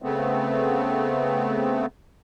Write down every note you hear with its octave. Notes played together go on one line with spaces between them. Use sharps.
C#3 A3 B3 C4